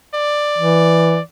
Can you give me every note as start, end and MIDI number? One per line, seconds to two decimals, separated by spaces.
0.15 1.21 74
0.58 1.19 52